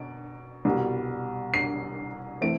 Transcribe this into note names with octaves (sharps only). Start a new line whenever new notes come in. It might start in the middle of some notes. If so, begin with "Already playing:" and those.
Already playing: B2 D7
C2 B2 G3
C7
E3 A3 C4 D7